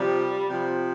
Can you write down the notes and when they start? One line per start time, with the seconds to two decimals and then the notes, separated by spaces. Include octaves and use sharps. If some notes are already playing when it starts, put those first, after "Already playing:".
Already playing: C3 F3 G3
0.48 C3 F3